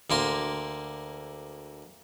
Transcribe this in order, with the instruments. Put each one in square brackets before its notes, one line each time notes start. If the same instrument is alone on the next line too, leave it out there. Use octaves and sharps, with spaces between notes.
[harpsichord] D2 A#3 C6